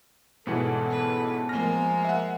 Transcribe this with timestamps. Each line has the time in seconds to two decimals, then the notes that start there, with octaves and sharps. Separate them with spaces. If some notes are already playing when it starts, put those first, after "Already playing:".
0.47 G#2 B2 E3 B3 C#4 A4 F#5
0.90 B4
1.49 F3 G#3 A#3 G#5 F6 A#6
2.05 E5 F#5